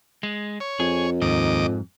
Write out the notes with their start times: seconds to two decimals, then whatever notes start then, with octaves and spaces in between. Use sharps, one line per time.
0.23 G#3
0.60 C#5
0.80 F2 G#4
1.22 D#2 G#2 D#5 D6